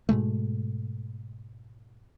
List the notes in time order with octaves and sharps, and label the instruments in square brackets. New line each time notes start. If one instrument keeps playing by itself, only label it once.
[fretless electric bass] G#2 B2 G#3 A3